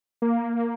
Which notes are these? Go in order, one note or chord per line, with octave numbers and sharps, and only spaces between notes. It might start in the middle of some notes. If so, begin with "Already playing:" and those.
A#3